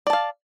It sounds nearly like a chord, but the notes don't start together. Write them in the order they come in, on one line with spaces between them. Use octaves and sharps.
D5 A5 F5